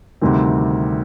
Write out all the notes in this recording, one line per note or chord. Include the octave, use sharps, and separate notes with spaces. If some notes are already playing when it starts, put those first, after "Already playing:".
D2 C3 D#3 G3 C4